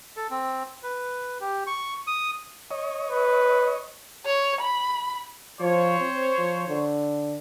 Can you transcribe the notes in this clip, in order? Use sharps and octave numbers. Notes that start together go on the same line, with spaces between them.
A4
C4
B4
G4
C#6
D#6
C#5 D#5
B4
C#5
B5
F3 C5 C#5
C4
F3
D3